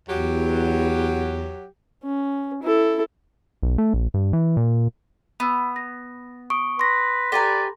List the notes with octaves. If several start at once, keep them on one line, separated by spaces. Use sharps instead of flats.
E2 F#3 G4
C#4
E4 A4
B1
A3
A#1
G2
E3
A#2
B3 B5 E6
A#6
C#6 D#6 D7
B4 C6 A#6
G4 A4 B4 D5 G#5 A#5